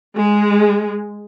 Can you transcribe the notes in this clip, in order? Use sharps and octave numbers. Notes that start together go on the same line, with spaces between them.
G#3